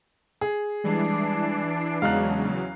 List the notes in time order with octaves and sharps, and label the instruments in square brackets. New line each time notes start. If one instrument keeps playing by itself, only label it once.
[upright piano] G#4
[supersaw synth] E3 C7 [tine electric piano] G3 G#3 [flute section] D4
[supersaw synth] E2 C#3 F#3 [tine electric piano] G#3 [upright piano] F5 A#5 F#6